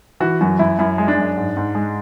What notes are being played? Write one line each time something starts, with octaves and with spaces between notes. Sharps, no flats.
E3 F#4
F#2 F#4
F#2 E4
F#2 E4
G#3
D4
F#2
G#2
G#2
G#3